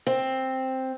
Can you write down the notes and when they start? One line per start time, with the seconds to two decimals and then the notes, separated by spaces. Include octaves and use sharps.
0.07 C4